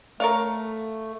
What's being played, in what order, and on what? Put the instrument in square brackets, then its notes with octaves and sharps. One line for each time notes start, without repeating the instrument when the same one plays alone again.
[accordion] A3 [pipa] A#4 C#5 F5